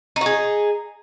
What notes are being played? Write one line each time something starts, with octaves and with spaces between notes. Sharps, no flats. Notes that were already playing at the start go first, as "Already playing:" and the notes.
D#4 F#4 G#4